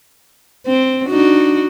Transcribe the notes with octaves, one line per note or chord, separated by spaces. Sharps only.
C4
D4 D#4 F#4